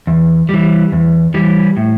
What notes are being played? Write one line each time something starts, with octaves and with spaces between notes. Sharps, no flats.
E2
E3 G3
E2
E3 G3
A2